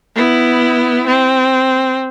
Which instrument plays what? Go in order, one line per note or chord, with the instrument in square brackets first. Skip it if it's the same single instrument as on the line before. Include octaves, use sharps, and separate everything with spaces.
[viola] B3 E4
C4